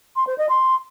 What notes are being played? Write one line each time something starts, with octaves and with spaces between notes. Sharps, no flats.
C6
C5
D#5
C6